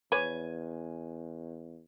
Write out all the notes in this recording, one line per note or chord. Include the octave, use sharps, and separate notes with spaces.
E2 B4 C#5 G#5